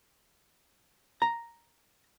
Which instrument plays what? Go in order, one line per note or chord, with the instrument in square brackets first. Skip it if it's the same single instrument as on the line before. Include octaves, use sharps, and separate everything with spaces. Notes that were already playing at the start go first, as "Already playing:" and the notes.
[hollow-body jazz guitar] A#5